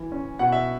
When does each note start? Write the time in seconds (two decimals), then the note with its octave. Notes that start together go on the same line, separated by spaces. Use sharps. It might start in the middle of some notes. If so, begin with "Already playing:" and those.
Already playing: E3
0.12 C#4
0.39 B2 F#5
0.52 E5